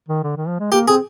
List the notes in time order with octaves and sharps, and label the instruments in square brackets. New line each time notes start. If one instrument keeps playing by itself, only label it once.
[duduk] D#3
D3
D#3
F3
G#3
[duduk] A#3 [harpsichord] G4
[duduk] C4 [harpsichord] G#4